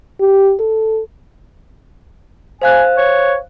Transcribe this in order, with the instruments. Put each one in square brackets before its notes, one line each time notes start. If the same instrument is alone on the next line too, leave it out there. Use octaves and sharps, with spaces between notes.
[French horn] G4
A4
[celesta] C5 F5 F#6 [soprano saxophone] G#5
[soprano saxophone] C#5